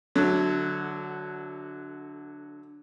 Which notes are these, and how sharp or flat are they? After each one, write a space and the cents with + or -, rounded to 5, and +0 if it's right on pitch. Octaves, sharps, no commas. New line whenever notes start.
D3 +0 F#3 -5 A3 -30